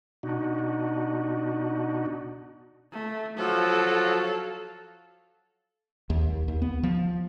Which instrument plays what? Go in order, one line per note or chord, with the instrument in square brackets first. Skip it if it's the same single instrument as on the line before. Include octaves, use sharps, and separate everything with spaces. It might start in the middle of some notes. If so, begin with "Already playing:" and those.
[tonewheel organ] B2 D4 D#4 F#4
[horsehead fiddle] A3
[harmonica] F3 F#3 [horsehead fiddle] A4 F5
[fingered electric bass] D#2
D#2
B3
F3